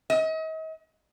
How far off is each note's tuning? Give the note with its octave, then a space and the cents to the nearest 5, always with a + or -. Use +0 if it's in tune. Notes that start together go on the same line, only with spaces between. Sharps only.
D#5 +40